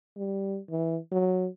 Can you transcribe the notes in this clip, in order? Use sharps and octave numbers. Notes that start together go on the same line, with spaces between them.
G3
E3
F#3